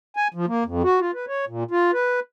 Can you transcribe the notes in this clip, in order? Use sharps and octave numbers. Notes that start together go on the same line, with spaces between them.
G#5
F3
A#3
F2
F#4
F4
B4
C#5
A#2
F4
B4